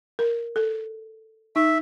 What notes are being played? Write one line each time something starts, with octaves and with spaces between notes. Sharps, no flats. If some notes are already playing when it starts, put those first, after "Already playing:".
A#4
A4
D#4 E5